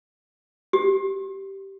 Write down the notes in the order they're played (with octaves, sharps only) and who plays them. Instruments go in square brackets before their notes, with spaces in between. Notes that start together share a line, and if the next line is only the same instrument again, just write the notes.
[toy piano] G4